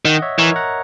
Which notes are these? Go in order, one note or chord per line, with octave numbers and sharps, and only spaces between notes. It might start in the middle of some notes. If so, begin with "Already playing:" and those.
D#3 D#5 F#5
C#5 E5
E3 A#4 C#5
F#5 A#5